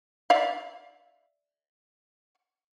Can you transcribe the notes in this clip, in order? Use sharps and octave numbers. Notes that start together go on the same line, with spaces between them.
D5 E5 F5